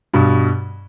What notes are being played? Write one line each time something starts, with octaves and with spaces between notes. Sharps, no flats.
G2 B2